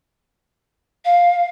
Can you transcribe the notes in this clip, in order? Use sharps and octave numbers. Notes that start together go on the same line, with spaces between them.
F5